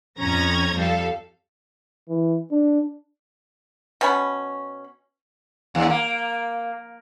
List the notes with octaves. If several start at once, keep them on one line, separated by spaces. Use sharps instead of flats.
F2 C#4 A#5 G#6 A#6
F2 G3 A4 F5
E3
D4
B2 C#4 B5
D#2
A#3